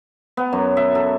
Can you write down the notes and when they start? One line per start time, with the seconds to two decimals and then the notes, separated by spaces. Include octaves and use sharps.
0.37 B3
0.53 F#2
0.77 E5
0.95 A4